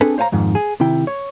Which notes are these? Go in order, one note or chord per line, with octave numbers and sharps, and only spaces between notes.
C4 D4 G#4 A4 B4
C5 C#5 F5 G#5 A#5
F2 G#2 D#3
G#4
C3 D#3 E4 G5
C#5